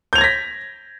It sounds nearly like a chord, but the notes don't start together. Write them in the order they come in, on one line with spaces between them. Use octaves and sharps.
G6 F7 G#6 A#6 B6